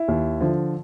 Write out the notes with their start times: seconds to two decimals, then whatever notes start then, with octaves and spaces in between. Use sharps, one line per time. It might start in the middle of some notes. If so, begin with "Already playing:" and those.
Already playing: E4
0.08 D#2
0.41 D3 F3